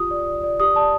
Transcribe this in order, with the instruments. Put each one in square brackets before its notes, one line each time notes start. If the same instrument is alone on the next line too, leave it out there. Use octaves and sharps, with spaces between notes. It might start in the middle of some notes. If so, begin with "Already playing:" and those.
Already playing: [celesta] F4 G4 D#6
D5
D5
D5
G4 D#6
D5 A5